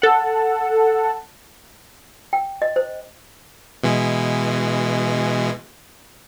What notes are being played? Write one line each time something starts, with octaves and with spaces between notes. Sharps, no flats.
A4 F#5
G5
D#5
C5
B2 E3 G#3